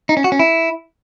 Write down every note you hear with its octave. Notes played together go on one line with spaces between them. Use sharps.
D#4
C#4
F#4
C#4
E4